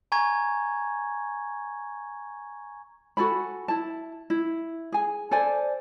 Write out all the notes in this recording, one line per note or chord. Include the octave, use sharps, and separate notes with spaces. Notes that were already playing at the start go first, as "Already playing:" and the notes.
G#5 A#5 C#6 G#6
F#4 A4 G#5 B5
E4 A5
E4
G#4 G#5
A4 C5 D5 G#5